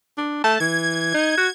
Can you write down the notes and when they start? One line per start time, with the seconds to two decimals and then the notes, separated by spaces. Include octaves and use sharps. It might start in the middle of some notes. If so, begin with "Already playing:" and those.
0.18 D4
0.44 A3 A5
0.60 E3 G#6
1.14 D#4
1.37 F#4